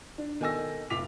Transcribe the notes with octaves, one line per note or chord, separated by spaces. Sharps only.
D4
B2 D#3 A4 G#5 E6 A#6
F1 F4 D6 B6 F7